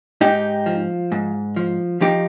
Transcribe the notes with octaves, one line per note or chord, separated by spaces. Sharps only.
G#2 D#4 G4
F3
G#2
F3
F3 D#4 G4